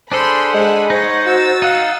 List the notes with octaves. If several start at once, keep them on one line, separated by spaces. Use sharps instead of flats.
D4 G#4 A4 C5 B5 C6
G#3 F#5 G#5 B5
D#4 C5 C#5 D#5 F#5
F#4 E6 A6
D#4 F5 F#5